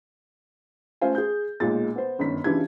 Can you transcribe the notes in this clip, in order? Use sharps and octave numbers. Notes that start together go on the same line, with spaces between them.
A3 C#4 F4 C5 F5 G#5
G#4 G6
B1 A#2 G#3 A6
B3 C5
G1 F#2 D#3 B6
C#3 E3 D4 F4 G4 G#6